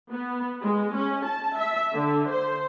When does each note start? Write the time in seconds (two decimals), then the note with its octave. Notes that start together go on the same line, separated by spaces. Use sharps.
0.11 B3
0.63 G#3
0.94 C#4
1.26 A5
1.58 E5
1.93 D3
2.30 C5